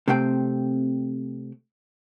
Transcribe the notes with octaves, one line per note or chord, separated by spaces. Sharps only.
C3 A3 C4 G5